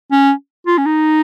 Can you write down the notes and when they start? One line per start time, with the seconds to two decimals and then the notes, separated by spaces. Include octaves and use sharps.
0.12 C#4
0.67 F4
0.78 C#4
0.86 D#4